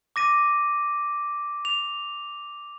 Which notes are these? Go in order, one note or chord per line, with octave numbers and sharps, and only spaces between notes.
D6 A#6 D#7
F7